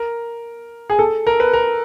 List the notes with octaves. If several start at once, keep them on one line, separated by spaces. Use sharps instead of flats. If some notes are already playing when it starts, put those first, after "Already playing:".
Already playing: A#4
G#4
A4
A#4
B4
A#4